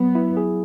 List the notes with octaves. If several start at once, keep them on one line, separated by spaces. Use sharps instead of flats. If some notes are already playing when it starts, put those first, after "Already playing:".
Already playing: F#3 B3
E4
G#4